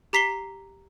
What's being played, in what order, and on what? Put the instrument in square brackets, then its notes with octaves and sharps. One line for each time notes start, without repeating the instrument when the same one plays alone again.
[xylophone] G4 A#5 B6 C7 G7